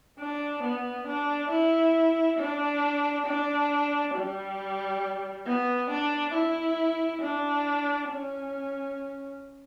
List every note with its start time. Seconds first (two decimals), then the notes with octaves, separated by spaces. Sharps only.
0.19 D4
0.64 B3
1.08 D4
1.52 E4
2.39 D4
3.27 D4
4.15 G3
5.47 B3
5.90 D4
6.34 E4
7.22 D4
8.10 C#4